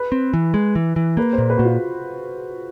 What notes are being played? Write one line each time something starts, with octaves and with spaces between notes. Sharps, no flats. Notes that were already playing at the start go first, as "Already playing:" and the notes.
Already playing: B4
C4
E3
G#3
E3
E3
A#3 B4
C5
A#2
B4
A#2 F#4
F4